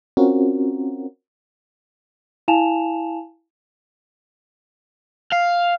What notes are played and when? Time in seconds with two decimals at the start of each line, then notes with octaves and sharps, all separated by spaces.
0.17 C4 C#4 F4 F#4 A#4
2.48 E4 F5 G#5 A5 E7 F7
5.32 F5